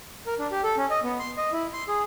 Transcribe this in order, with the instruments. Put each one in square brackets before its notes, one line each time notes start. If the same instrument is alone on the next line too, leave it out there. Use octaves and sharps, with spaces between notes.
[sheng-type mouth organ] A#4
D4
G4
A4
C#4
D#5
B3
C6
D#5
E4
C6
G#4